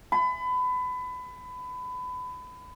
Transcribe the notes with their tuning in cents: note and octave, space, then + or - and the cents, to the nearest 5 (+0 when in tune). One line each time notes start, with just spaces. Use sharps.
B5 +25